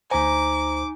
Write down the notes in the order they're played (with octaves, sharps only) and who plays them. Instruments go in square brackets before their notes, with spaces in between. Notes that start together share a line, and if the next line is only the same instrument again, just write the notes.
[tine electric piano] D2 C5 [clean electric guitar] D#4 G#5 [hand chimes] A#5 [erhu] D6